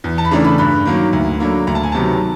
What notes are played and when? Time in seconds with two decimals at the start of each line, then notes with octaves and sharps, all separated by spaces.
0.04 E2
0.18 A5
0.25 B5
0.31 C#3 E3 A3 D4 A#5
0.44 B5
0.58 G2 B5
0.85 D#3 F#3 A#3
1.13 D2
1.40 D3 F#3 A#3
1.67 D2 A#5
1.75 A5
1.83 G#5
1.92 C3 D#3 F#3 B3 A5